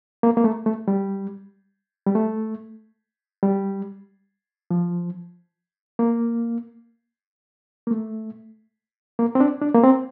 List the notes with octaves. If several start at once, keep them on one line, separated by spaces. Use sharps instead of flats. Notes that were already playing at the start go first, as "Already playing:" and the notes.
A#3
A#3
A3
A3
G3
G3
A3
G3
F3
A#3
A#3
A3
A#3
C4
D4
D4
A#3
C4